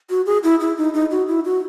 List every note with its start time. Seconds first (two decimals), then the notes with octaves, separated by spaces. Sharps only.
0.10 F#4
0.26 G#4
0.44 E4
0.60 E4
0.78 D#4
0.94 D#4
1.11 F#4
1.28 E4
1.45 F#4